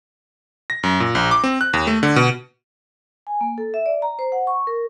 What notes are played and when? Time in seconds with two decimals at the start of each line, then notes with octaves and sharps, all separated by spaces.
0.70 A#6
0.83 F#2
1.00 A#2
1.15 A#1
1.31 D6
1.44 C4
1.61 F#6
1.73 D#2
1.87 A3
2.03 D3
2.16 B2
3.27 G#5
3.41 A#3
3.58 A4
3.74 E5
3.86 D5
4.02 A#5
4.19 C5
4.32 F#5
4.47 C#6
4.67 A#4